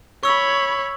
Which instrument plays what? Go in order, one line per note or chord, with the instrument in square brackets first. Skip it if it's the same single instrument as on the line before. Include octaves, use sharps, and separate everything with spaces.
[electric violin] C#5 B5 [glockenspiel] C#6 E6